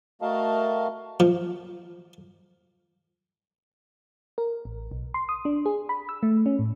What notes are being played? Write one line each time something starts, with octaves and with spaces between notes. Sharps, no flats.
A3 F#4 A#4 D#5 F5 A5
F3
A#4
A1
B1
C6
D#6
D4
G#4
B5
E6
A3
C#4
A2